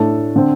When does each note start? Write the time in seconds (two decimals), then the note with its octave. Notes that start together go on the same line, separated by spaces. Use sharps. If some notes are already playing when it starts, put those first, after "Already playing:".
Already playing: A2 A3 D4 A4
0.36 D3 C4